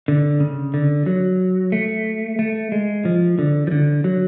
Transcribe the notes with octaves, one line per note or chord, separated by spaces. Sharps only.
D3
C#3
D3
F#3
A3
A3
G#3
F3
D3
F3
D3
F#3